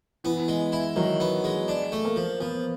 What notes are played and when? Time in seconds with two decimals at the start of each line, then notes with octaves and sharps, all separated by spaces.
0.24 E3 B3
0.48 G#3
0.72 E4
0.96 D#3 F#3
1.20 B3
1.44 G#3
1.68 D4
1.92 A3
2.05 A#3
2.16 F3
2.40 F3 B3